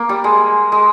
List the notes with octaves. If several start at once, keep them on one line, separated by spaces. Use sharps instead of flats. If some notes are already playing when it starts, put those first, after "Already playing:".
Already playing: A#3
G3
G#3
G#3